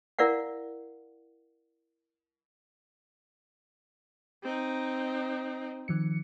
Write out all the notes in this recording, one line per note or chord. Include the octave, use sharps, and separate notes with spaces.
E4 A#4 D5 F5 F#5
C4 D#4
D#3 F3 C#7